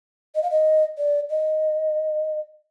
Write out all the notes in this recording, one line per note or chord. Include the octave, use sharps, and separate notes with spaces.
D#5
F5
D#5
D5
D#5